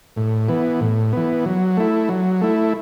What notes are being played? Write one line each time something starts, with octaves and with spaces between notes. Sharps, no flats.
A2
E3 B3
A2
E3 B3
F#3
A3 E4
F#3
A3 E4